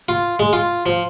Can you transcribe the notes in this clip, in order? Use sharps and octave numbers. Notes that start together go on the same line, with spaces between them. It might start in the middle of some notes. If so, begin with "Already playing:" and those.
F4
G#3
F4
F3